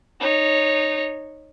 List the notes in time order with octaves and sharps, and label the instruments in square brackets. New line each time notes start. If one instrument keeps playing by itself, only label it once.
[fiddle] D#4 C#5